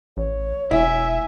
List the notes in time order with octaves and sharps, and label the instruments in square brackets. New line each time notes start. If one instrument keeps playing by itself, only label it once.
[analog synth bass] A1 [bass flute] C#5
[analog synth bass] E1 [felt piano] E4 [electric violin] E5 G#5